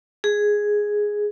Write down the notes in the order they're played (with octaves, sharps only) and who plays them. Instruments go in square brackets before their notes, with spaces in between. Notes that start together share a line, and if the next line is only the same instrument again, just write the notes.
[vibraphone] G#4